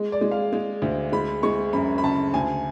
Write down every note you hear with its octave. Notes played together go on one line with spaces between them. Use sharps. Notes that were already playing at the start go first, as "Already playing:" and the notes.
Already playing: G#3
D5
G#3
F5
G#3
D2
G#3 B5
G#3 C#6
F#2 B5
B5
C#3 A5
D2 G#5